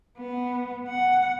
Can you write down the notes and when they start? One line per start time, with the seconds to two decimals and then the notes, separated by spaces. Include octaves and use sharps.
0.18 B3
0.89 F#5